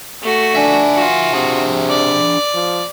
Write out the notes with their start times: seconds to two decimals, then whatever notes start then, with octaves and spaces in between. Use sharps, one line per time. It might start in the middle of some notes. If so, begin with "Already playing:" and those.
0.21 A3 F#4
0.55 D4 E5 G#5
0.95 F4 F#4
1.33 C3 D4 G#4
1.90 D5
2.54 F3